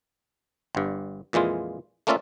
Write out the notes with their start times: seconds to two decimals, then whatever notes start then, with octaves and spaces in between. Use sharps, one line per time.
0.75 G1 G2
1.33 F2 A#2 E3 G#3 F4
2.07 A3 A#3 C#4 F4 D5 E5